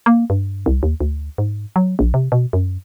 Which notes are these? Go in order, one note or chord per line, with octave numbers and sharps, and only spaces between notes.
A#3
G2
C2
D#2
D2
G#2
F#3
A#1
C3
B2
F#2